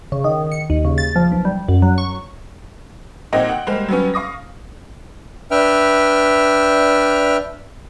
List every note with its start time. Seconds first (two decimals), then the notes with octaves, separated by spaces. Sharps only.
0.12 C#3
0.24 D#3
0.52 C#7
0.70 D#2
0.85 C#3
0.98 A6
1.16 F3
1.32 B1
1.45 G3
1.68 F#2
1.82 F#3
1.98 C#6
3.33 A#2 C4 D#4 D#5 F#5
3.49 F#5 G5
3.67 G3 G#3 A#3 C5 F7
3.88 F#3 G3 B3 C#4
4.14 F5 C#6 D#6 A#6
5.51 D4 B4 E5 G5 F6